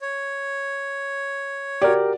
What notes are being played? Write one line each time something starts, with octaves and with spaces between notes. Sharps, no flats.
C#5
F#4 G4 A#4 D5